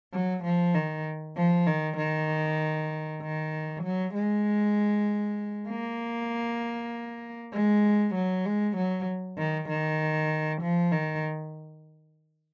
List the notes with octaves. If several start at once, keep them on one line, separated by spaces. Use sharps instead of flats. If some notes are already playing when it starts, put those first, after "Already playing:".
F#3
F3
D#3
F3
D#3
D#3
D#3
F#3
G#3
A#3
G#3
F#3
G#3
F#3
D#3
D#3
F3
D#3